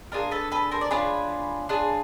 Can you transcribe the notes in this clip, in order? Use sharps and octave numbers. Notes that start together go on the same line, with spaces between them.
D4 F4 G#4 A#4
A4 B4
A4 B4
A#4 C5
D5
D4 F4 G#4 B4 C#5
D4 F4 G#4